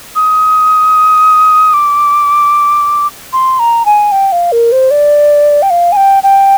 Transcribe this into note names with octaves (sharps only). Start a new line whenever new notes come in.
D#6
D6
C6
A#5
G#5
G5
F5
A#4
C5
D5
G5
F5
G#5
G5
G5